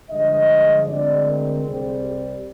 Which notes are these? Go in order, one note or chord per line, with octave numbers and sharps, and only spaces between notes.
G2 D3 F3 G#3 D#5
D2 D3 G#3 C4 D5
A#4
C2 C3 G3 C4 G#4
G4